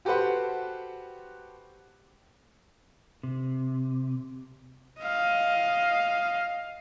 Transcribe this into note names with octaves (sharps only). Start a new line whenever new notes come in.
F#4 G4 A4 B4 C5 F#5
C3
D#5 F5